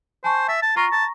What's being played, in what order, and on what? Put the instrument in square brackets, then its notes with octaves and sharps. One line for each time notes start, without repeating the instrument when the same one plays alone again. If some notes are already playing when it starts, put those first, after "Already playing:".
[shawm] C5 [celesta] G#5 A5 C#6
[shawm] E5 [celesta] A6
[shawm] A5
[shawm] F4 [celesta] A#5 C#6 A#6
[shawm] A5